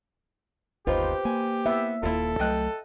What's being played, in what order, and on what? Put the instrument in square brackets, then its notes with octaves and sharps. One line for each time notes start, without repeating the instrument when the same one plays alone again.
[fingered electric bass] G1 D#2 [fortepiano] D#4 F4 [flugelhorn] G4 [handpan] B4 C5
[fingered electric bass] A#3 [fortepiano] G#5
[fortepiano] B3 [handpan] E5
[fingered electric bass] D#1 D#2 A#3 [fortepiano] E4 F4 [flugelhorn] A4
[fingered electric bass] C2 F#3 A3 [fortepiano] D#5 G5 F#6